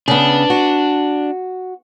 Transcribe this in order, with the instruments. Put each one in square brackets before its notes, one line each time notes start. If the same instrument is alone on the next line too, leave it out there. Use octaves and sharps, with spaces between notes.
[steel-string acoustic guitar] C#3 B3 [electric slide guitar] D4
[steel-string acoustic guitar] F#4